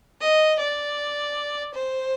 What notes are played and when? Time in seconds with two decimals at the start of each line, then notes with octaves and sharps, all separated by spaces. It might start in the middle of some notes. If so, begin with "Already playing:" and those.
0.21 D#5
0.59 D5
1.74 C5